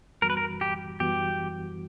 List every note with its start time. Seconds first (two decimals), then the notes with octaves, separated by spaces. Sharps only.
0.22 F#2 E3 G3 B3 F#4 A#4
0.30 B4
0.37 A#4
0.61 G4
1.00 F#2 E3 G3 B3 F#4 G4